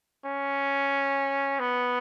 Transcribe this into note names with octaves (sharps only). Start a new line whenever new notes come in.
C#4
B3